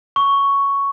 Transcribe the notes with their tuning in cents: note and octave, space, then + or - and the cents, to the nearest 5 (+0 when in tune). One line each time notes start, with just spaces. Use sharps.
C#6 +5